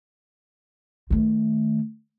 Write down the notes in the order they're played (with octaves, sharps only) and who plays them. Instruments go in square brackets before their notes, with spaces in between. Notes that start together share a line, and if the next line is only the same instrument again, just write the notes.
[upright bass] D#3 A3